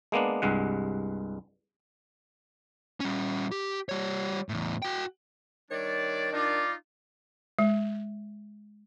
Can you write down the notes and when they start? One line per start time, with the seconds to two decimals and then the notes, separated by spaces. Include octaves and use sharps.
0.12 G#3 A#3 B3 D4
0.42 C2 G2 G#3 F#5
3.00 G3 C#4
3.51 G4
3.89 G3 C#5
4.49 E2 A2
4.82 F#4 G5
5.71 D#3 G3 D4 C#5 D5
6.33 D4 D#4 F4 D5
7.59 G#3